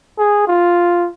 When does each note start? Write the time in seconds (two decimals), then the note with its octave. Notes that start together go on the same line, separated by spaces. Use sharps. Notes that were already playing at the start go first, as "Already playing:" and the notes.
0.18 G#4
0.48 F4